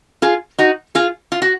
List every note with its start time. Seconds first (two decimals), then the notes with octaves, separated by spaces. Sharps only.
0.22 F4 G#4
0.58 D#4 F#4
0.95 F4 G#4
1.32 F4
1.42 F#4